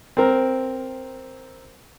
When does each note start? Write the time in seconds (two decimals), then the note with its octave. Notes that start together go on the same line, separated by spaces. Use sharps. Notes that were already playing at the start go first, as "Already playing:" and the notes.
0.17 C4 A#4